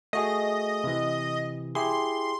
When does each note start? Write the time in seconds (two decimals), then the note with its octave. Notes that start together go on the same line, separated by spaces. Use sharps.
0.13 A3 F#4 G#4 D#5
0.84 C3 E3
1.75 E4 G4 G#4 C6